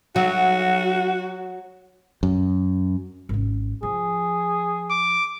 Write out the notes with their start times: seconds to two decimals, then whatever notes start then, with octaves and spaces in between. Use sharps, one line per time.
0.16 F#3 F#4
2.23 F#2
3.29 G#1 C#4
3.83 F3 G#4
4.91 D6